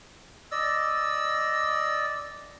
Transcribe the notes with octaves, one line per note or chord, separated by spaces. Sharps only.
D5 D#5 E6